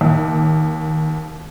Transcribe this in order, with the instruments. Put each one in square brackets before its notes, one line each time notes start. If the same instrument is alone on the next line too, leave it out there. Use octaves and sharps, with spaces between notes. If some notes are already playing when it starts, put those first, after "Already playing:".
[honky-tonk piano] D#2